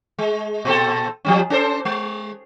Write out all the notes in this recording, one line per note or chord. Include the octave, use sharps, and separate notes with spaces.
G#3
A#2 C4 A4
F3 G3 C#4
C#4 A4 C5
G#3